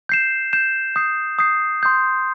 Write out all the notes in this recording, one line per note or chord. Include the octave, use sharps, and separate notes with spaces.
G6 C7 E7
G6 C7 E7
D#6 G6 C7
D#6 G6 C7
C6 D#6 G6